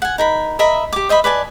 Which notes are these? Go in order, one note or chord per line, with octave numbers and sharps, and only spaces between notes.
F#5 G#5
D#4 A#4 B5
A#4 D#5 E5 B5
G4 D6
C5 D#5 E5 B5
B4 D5 G#5 A5